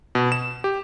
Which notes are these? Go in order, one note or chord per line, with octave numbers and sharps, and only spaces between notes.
B2
E7
G4